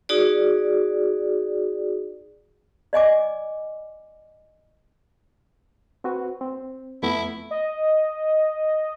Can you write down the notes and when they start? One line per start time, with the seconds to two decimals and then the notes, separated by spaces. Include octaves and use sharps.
0.09 D#4 F#4 G#4 D5
2.93 D5 D#5 G#5 D6
6.04 C4 F#4 B4
6.41 C4
7.03 F2 A3 B3 E4
7.51 D#5